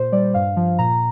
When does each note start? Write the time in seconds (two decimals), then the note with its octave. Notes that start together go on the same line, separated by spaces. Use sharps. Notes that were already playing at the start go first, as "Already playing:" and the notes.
Already playing: A#2 C5
0.12 G3 D5
0.34 G2 F5
0.56 F3
0.79 A#2 A#5